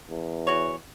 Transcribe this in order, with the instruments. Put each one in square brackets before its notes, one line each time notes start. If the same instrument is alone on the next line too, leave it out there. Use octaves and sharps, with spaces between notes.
[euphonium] E2
[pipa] E3 F#4 C#5